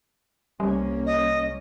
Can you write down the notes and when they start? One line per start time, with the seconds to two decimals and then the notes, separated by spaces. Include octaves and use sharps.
0.60 C2 G3 A#3 C#4
1.06 D#5